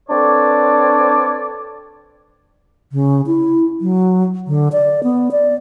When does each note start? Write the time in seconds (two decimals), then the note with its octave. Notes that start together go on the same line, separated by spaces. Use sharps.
0.09 C4 D4 A4 B4 C#5 D5
2.91 C#3
3.26 E4
3.81 F#3
4.47 D3
4.72 D5
5.03 B3
5.31 D5